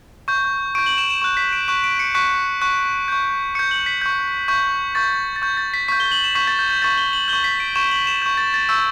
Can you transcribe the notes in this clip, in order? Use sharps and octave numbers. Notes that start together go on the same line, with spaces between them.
C#6 G6
C#6 G6 D7
F#7
E7
E7
C#6 F#6
B6
D7
C#6 F#6 E7
D7
C#7
C#6 F#6 B6
C#6 F#6
C#6 G6
C#6 G6 C#7
F#7
B6
C#6 G6
C#6 G6
C#6 G6 A6
A6
C#6 G6
A6
B6
C#6 G6 B6
G7
F#7
E7
C#6 G6 B6
A6
G6
G6
C#6 G6 A6
G7
F#7
G6 G7
C#6
B6
D7
C#6 G6 E7
F#7
E7
C#6 G6
A6
A6
C#6 E6 G6